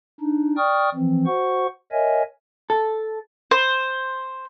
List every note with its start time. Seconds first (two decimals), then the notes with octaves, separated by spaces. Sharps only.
0.20 D4 D#4
0.57 D5 G5 C#6 D#6 F6
0.95 E3 F3 C4
1.26 F#4 C5 F#5 C#6
1.92 A#4 C#5 D#5 E5 G#5
2.70 A4
3.51 C5